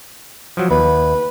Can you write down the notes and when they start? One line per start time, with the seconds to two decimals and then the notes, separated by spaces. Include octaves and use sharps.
0.57 F3 F#3
0.71 D#2 B4